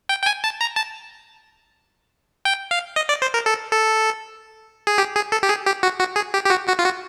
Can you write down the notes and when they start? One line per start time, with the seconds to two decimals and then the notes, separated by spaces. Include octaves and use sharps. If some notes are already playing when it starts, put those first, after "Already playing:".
0.09 G5
0.22 G5
0.26 G#5
0.44 A5
0.61 A#5
0.76 A5
2.45 G5
2.71 F5
2.96 D#5
3.09 D5
3.22 C5
3.34 A#4
3.46 A4
3.72 A4
4.87 G#4
4.98 G4
5.16 G#4
5.32 A4
5.43 G4
5.49 G#4
5.66 G4
5.83 F#4
5.99 F#4
6.16 G#4
6.34 G4
6.45 G4
6.50 F#4
6.68 F#4
6.79 F4
6.84 F#4